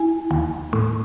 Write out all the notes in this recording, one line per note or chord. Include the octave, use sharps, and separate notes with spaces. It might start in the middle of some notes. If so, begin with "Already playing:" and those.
Already playing: E4 G#5
D#2
A2